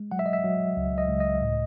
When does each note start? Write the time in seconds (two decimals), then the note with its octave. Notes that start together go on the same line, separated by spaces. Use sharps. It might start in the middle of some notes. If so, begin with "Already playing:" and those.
Already playing: G#3
0.11 F#3 F#5
0.19 E5
0.26 D#5
0.33 E5
0.44 F#3
0.77 C#2
0.98 D#5
1.09 C#2
1.20 D#5
1.42 A2